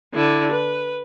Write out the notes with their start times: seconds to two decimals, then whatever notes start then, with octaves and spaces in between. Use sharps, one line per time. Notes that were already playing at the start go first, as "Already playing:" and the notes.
0.15 D3 E4
0.52 B4